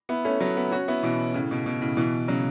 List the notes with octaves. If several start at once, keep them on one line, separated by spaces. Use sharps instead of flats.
B3 E4
A3 C#4
F#3 B3
B3 E4
C#4 F#4
B3 E4
B2 E3
A2 C#3
B2
B2
A2 C#3
B2 E3
C#3 F#3